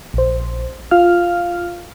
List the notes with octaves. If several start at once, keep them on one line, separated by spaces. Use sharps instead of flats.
A#1 C5
F4 F5 F6